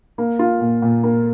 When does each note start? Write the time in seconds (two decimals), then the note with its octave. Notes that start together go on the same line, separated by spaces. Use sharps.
0.18 A#3
0.39 F4
0.61 A#2
0.82 A#2
1.03 A#3